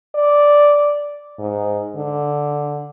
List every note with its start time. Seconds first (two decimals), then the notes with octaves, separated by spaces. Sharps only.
0.15 D5
1.39 G#2
1.96 D3